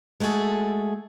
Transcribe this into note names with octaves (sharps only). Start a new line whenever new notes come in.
G#3 A3 F#4 G#4 A4